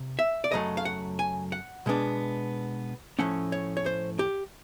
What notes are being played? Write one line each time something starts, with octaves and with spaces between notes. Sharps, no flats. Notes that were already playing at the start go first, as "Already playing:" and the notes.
Already playing: C3
E5
D5
F#2 C#3 F#3 A3 D#5
F5
F#5
G#5
F#5
B2 G#3 B3 D4
A2 F3 A3 C#4 F#5
C#5
C#5
C5
G4